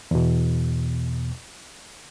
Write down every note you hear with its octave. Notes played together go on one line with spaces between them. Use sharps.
E2 B2